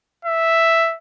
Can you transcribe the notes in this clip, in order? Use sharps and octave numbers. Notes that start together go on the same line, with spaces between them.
E5